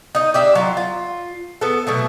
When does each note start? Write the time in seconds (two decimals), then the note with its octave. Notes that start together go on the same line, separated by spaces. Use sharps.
0.15 D#4 D#5
0.34 D4 G4 E5
0.55 F#3 F4
0.77 F4
1.61 B3 A4
1.87 B2 F#3 A3